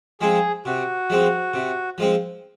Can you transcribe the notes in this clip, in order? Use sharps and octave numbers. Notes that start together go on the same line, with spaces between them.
F3 G#3 C4 G#4
C3 F#4
F3 G#3 C4
C3
F3 G#3 C4